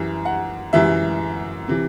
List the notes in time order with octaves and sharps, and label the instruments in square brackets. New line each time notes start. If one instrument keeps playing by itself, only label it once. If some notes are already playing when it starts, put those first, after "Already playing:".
Already playing: [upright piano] F#2 E3 G3
F#5
F#2 E3 G3 E5
C3 E3